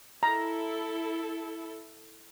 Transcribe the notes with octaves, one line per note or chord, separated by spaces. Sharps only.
E4 A4 A#5